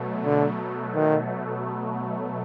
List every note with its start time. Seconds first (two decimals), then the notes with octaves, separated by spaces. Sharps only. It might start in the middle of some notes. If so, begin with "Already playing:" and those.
Already playing: B2 F#3 A3
0.25 D3
0.95 D#3